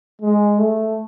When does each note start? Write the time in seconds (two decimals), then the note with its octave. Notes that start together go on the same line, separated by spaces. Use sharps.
0.22 G#3
0.59 A3